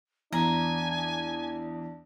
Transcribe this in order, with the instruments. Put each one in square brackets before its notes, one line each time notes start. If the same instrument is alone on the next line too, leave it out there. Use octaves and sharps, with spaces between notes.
[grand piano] E2 [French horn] D4 [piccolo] G#5 [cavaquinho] A#5